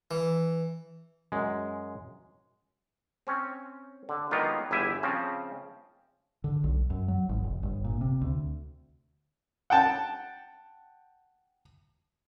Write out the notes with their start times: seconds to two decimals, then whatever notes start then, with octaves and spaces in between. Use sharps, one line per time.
0.11 E3
1.32 F#2 G#3
3.27 C4 C#4 C#5
4.09 D3
4.31 D#3 F#3 G#3 A#3 B3 F4
4.71 G1 E2 E4 G4 E5 G#5
5.03 C#3 F3 C4 C#4
6.44 D3
6.64 B1
6.90 F#2
7.08 F#3
7.29 G#1
7.44 F1
7.63 G1
7.85 A#2
8.01 C3
8.22 D2
9.70 F#5 G5 A5